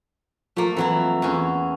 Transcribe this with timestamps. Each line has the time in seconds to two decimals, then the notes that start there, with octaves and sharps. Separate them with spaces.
0.57 F3 A3 A#3
0.77 F2 E3 F#3 E4
1.22 E2 C#4